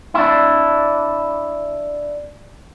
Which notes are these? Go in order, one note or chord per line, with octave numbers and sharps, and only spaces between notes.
D4 E4